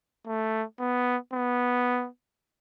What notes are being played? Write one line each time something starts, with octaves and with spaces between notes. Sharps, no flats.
A3
B3
B3